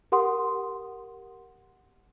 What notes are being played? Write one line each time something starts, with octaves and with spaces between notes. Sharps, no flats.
G4 A#4 F#5 C6 D#6